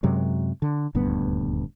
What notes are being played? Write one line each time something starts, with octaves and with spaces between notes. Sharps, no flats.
F#2 C3 F#3 G#3
D3
D#1 D2 G2 B3